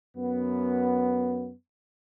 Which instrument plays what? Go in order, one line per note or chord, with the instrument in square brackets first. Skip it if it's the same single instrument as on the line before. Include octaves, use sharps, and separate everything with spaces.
[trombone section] F#2 B3